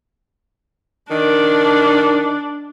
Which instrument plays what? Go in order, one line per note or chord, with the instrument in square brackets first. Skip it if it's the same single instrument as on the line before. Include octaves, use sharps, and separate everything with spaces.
[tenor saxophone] D#3 [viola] D4